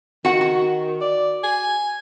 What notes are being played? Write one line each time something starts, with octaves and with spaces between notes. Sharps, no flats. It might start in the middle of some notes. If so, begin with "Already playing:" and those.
D#3 F#4 F#5
F#4
D5
G#5